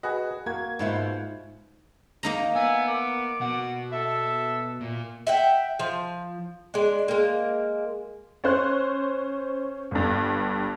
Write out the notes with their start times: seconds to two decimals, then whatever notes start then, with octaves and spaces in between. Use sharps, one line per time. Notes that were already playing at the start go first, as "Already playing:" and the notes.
0.03 F#4 G#4 B4 D#5
0.46 A#3 F#4 G#6
0.79 G#2 B2 F4 C5 E5
2.23 A#3 D#4 A#5
2.55 B3 E5 G#5
2.88 A#4 D6
3.41 B2 F#5
3.92 A4 E5
4.81 A#2
5.27 E5 F#5 G5
5.79 F3
6.74 G#3 D4
7.08 G#3 A#3
8.44 C#4 C5 F#6
9.91 G1 G2